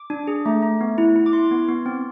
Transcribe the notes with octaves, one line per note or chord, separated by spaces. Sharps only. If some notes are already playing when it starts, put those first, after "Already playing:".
Already playing: D6
D4
G#4
A3
A3
B3
E4
E4
D6
E4 C6
B3
B3
C4